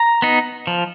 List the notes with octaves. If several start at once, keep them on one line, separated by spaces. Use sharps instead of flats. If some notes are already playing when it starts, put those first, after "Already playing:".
Already playing: A#5
B3 D#4
F3